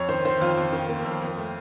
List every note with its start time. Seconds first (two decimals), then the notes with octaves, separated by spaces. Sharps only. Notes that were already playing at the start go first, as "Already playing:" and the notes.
Already playing: F2 C#5
0.09 D#3 C5
0.25 D#3 C5
0.41 F2 F4
0.57 F2
0.73 D#3
0.89 A#3
1.05 F2
1.22 F2
1.38 A3